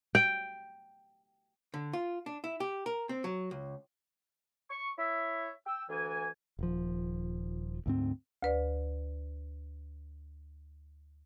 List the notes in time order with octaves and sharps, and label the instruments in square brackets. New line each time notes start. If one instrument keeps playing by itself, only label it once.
[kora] G5
[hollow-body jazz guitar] D3
F4
D4
E4
G4
A#4
C4
F#3
C#2
[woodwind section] C#6
E4 C#5 E5
G5 E6
D2 E3 G#5
[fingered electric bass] D#1 F3
D2 G#2 C4
[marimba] D2 B4 D5